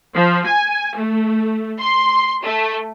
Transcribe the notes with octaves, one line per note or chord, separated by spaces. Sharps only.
F3
G#5
A3
C6
A3